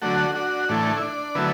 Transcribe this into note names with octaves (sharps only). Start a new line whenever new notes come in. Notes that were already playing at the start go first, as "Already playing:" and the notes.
D3 F#3 A3 D4 F#4
D4 F#4
A2 E3 A3 D4
E4
D4
D3 F#3 A3 B3 E4